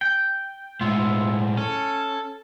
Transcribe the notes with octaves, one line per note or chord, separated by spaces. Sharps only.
G5
A2 G#3 B3 E4 F4
C#4 A4